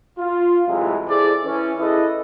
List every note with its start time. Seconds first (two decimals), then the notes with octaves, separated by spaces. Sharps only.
0.19 F4
0.68 A2 C3 E3 F#3 G#3 A3
1.08 E4 G#4 A4 C5 D5
1.45 E3 C#4
1.79 E4 G#4 A4 B4 D#5